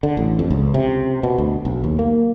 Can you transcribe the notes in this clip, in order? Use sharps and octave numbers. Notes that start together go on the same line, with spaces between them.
D3
A1
F2
C#2
C3
B2
D2
B1
D#2
A#3